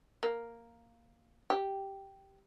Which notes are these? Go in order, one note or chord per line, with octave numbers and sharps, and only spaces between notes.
A#3
G4